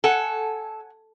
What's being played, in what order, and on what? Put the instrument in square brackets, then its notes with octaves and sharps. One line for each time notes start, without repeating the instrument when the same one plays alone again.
[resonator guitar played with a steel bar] A4 [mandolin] C#5 F#5 G#5